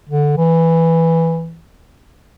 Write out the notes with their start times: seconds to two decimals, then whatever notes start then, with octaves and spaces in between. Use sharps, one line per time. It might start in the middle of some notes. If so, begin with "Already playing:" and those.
0.09 D3
0.37 E3